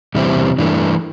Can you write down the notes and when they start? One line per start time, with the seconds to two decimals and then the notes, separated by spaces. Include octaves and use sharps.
0.15 E2 C3 G3 C4 E4
0.58 G2 E3 A3 D4